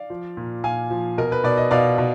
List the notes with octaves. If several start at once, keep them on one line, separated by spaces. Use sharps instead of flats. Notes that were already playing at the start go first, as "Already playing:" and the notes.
Already playing: D5 F5
F3
A#2
A#2 F5 G#5
F3
B2 A#4
B4
B2 D5
D#5
B2 D5 F5
B2